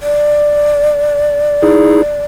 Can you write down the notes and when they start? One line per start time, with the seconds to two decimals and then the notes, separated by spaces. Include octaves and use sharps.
0.01 D5
1.62 D#4 E4 G#4